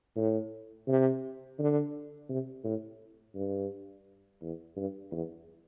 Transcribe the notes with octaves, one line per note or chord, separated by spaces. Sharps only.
A2
C3
D3
C3
A2
G2
E2
G2
E2